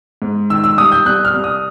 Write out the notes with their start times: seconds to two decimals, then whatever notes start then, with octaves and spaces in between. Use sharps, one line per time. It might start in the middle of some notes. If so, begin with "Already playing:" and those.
0.22 G#2
0.50 D#3 E6
0.64 E6
0.78 G2 D#6
0.92 G6
1.05 C2 F#6
1.25 F6
1.34 C2
1.44 D#6